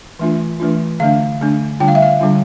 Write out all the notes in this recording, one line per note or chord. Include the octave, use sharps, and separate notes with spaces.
E3 A3 D4 F4
E3 A3 D4 F4
D3 A3 D4 F5
D3 A3 D4
D3 G3 D4 F4 G5
F5
E5
F5
D3 G3 D4 F4